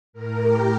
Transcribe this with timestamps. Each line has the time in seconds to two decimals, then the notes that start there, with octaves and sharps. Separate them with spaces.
0.13 A2 A#4
0.42 G4